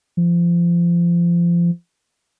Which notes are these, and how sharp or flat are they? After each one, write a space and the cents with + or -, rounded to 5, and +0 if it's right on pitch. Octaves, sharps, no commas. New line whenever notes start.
F3 -25